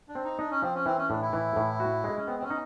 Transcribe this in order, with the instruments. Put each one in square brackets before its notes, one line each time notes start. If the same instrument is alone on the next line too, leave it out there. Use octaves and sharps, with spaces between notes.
[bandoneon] D4
[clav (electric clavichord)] C4
[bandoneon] D#4
[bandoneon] D4 [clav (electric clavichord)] D#4
[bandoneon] C#4
[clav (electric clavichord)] F3 [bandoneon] C4
[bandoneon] C#4
[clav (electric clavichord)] E3 [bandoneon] C4
[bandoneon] C#4
[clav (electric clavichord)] A2 [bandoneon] D4
[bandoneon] E4
[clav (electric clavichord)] E3
A2
F#4
G#3
[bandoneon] C#4
[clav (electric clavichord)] B3 [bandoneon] C4
[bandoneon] C4
C#4
[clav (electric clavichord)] D#4